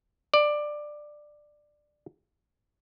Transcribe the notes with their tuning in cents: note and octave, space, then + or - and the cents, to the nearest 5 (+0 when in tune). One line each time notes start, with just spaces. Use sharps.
D5 +15